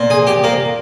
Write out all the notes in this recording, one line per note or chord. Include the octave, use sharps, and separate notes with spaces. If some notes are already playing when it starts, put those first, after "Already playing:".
Already playing: A#2
G#4
G4
A#3